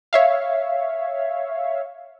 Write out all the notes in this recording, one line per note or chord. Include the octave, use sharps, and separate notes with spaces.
C#5 E5 F5